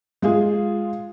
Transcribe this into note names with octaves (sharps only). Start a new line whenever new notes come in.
G#3 F4 G#4